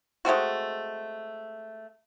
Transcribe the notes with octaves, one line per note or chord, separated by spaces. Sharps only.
G#3 A3 C4 F#4